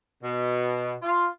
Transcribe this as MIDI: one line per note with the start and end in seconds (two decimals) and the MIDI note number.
0.23 0.94 47
1.02 1.28 65